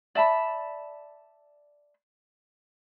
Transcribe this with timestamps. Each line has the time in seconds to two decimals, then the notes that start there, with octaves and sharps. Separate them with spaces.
0.15 D5 E5 A5 B5